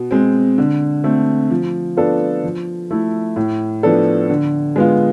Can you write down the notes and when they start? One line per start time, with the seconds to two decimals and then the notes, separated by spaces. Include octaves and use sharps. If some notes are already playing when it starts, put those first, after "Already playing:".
Already playing: B2
0.11 G#3 C4
0.58 D3
1.04 A3 C4
1.50 F3
1.97 B3 D4 F4 A4
2.44 F3
2.91 A3 E4
3.36 A2
3.83 F3 B3 D4 A4
4.30 D3
4.76 G#3 B3 F4